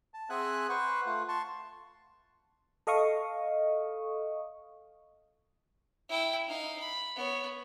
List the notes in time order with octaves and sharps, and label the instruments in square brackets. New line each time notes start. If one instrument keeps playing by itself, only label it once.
[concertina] A5
C4 G#4 E5 F#5 G#5 F#6
B4 C5 F#5 C#6
A3 F4 F#5
A5 C6 C#6
[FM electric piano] A4 D#5 F5 C#6 D#6
[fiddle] E4 G5
D#4 F5
B5
B3 C#5